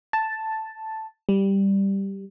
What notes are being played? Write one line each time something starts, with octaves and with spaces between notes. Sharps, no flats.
A5
G3